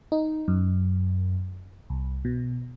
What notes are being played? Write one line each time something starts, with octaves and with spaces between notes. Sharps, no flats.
D#4
F#2
C2
B2